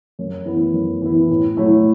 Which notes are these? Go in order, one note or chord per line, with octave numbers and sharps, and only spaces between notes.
F#2
E3 B3 E4
F#2
E3 B3 E4
A2
F#3 A3 E4